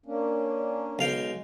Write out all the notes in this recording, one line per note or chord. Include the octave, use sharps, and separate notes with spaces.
A#3 C#4 D4
B1 G#3 F5 G5